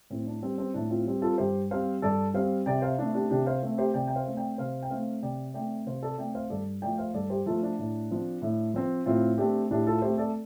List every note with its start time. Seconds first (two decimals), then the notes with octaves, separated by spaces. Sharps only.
0.10 A2 C4
0.27 D4
0.42 G3 C4
0.58 C4
0.74 A2 D4
0.90 C4 F4
1.06 G3 C4
1.22 F4 A4
1.38 G2 G4 C5
1.71 G3 C4 C5 F5
2.02 G2 A4 D5
2.34 G3 C4 C5 F5
2.66 C3 D5 G5
2.82 C5 F5
2.98 A3 C4 D4
3.14 D4 G4
3.30 C3 D4 G4
3.46 C5 F5
3.62 A3 C4
3.78 G4 C5
3.94 C3 D5 G5
4.07 G5
4.16 C5 F5
4.27 A3 C4
4.37 D5 G5
4.58 C3 C5 F5
4.83 G5
4.90 A3 C4 C5 F5
5.22 C3 D5 G5
5.54 A3 C4 D5 G5
5.86 C3 C5 F5
6.03 A4 D5
6.18 A3 C4 D5 G5
6.35 C5 F5
6.50 G2 A4 D5
6.82 F3 A3 D5 G5
6.98 C5 F5
7.14 G2 A4 D5
7.30 G4 C5
7.46 F3 A3 F4 A4
7.63 D4
7.79 A2
8.11 F3 C4
8.42 A2
8.74 F3 C4
9.06 A2 C4 F4
9.38 A3 C4 D4 G4
9.71 A2 D4 G4
9.87 F4 A4
10.02 A3 C4 G4 C5
10.18 A4 D5